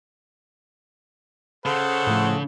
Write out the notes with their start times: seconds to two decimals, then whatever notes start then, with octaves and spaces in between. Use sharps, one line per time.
1.65 C#3 A4 C5 F#5
2.07 A2 F3 A3